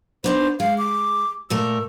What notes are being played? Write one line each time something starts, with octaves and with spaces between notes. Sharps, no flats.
B3 D4 D#4 C5
G#3 F5
D6
A#2 A3 A#4 E6